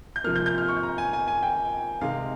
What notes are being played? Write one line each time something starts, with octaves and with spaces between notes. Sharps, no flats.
G6
C3 F3 A#3 F6
G6
G6
F6
C#6
A#5
G#5
G#5
G#5
G5
C3 D#3 G#3 F5